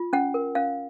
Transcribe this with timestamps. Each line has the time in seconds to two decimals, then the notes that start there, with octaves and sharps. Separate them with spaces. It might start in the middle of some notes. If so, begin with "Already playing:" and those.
Already playing: F4
0.13 C#4 F#5
0.34 A#4
0.55 C#4 F5